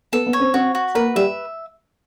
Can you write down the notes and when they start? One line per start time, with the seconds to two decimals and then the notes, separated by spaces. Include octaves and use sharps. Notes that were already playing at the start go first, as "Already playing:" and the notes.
0.12 B3 A4 B4
0.26 B3 B4
0.33 C#5
0.39 C4 C5
0.54 C4 F#4 C5
0.75 F#4
0.95 A#3 A#4 B4
1.16 G3 G4 E5